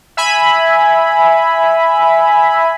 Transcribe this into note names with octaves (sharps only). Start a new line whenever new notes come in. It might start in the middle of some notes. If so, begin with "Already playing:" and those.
E5 G#5 B5